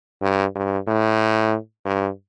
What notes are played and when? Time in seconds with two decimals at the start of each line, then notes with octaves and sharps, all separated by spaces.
0.22 G2
0.55 G2
0.87 A2
1.85 G2